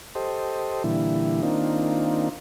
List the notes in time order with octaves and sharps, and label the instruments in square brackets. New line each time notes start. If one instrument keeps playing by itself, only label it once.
[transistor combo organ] G4 A4 C5 D#5
A#2 D3 E3 G3 E4
D#3 A#3 C4 D4 D#4 F4